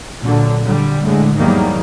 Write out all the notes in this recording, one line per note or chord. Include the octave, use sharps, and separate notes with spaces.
A#2 D3 F#3
D3 G3
A2 D3 G#3
E2 G#2 D#3 F#3 G3 A#3